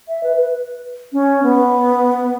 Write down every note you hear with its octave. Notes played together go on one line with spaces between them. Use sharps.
E5
B4
B4
C#4
B3